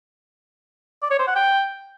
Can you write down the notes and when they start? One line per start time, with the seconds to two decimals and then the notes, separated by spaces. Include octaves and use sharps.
1.02 D5
1.11 C#5
1.19 C5
1.27 F#5
1.36 G5